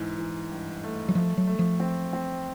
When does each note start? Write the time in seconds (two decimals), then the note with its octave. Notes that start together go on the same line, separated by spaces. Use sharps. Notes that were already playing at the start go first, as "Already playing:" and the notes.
Already playing: G#2 E3
0.19 E3
0.51 G2
0.84 A3
1.08 F#3
1.15 F3 A3
1.37 F#3
1.47 A3
1.59 F3
1.80 C4
2.13 C4